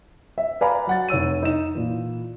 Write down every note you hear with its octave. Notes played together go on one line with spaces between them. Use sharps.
E5
B4 D5 F5 G#5 A#5 B5
F#3 F#5 A6
F1 C#5 E6 D#7
D#4 E7
A#2 E3